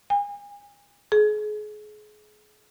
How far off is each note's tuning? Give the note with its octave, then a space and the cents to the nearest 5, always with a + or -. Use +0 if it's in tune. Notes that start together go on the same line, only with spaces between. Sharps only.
G#5 -35
G#4 +30